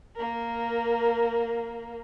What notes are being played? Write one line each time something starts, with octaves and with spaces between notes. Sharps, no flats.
A#3 A#4